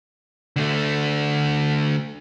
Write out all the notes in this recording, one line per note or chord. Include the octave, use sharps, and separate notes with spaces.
D3 A3